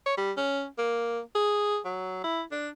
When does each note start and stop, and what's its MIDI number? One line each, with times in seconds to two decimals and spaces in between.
0.06 0.15 73
0.17 0.32 55
0.37 0.66 61
0.78 1.20 58
1.35 1.79 68
1.85 2.23 54
2.24 2.42 64
2.51 2.69 62